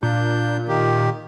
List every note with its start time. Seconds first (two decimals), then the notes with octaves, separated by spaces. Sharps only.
0.03 A#2 D4 G6
0.68 D#3 G4